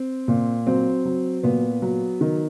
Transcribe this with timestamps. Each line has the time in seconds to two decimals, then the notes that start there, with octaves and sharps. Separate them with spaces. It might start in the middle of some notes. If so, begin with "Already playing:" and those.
Already playing: C4
0.28 A#2
0.67 F#3 C4
1.05 F#3
1.43 A#2 B3
1.82 F#3
2.21 D#3